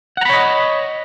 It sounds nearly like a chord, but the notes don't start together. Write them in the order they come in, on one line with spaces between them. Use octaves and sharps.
F#5 A#5 B5 C#5 D#5